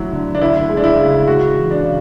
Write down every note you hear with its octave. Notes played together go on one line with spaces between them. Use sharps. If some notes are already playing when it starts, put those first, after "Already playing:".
Already playing: D2 F#3 E4
D3
D4
D2 E4
G#3
D4
E4
C#3
G#3 F#4
E3
D4
C#3